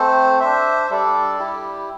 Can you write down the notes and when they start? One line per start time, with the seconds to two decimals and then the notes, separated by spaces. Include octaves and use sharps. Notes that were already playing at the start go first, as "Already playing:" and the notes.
Already playing: A3 C4 A4 C5
0.40 D4 C5 E5
0.90 G3 D4 A4 D5
1.39 G3 E4 G4